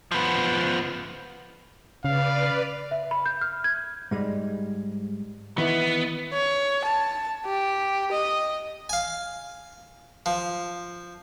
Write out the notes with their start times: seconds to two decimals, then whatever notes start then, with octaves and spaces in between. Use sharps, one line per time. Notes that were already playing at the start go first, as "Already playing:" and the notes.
0.11 F3 B3
2.04 C#3 B4 D5 F5
2.91 E5
3.11 B5
3.26 G6
3.41 F6
3.64 G#6
4.11 G#2 G3 G#3
5.58 D#3 E3 B3 E4
6.33 C#5
6.84 A5
7.45 G4
8.12 D#5
8.89 F5 G#5
10.26 F3